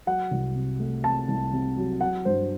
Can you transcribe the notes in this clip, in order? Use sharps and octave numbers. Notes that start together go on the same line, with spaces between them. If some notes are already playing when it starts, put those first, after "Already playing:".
F#3 F#5
C2
C3
A3
C3 A5
C2
C3
F#3
F#3 F#5
G2 C5